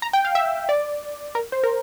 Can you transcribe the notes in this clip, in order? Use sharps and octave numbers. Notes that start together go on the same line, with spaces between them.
A#5
G5
F5
E5
D5
A#4
C5
A#4